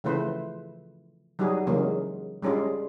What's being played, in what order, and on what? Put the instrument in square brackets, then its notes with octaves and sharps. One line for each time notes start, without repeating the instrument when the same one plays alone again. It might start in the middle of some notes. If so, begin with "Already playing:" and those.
[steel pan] C#3 E3 F3 A3 B4 C5
F#3 G3 D#4 F#4 G#4
C#3 E3 F#3 G#3 A#3 C#4
G3 G#3 C#4 D4 F4